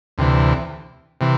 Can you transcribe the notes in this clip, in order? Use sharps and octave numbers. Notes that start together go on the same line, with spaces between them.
D2 C3 E3
C3 E3